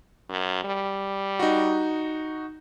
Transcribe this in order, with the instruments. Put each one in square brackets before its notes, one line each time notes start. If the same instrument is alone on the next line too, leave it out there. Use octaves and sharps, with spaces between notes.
[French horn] F#2
G3
[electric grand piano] D#4 F#4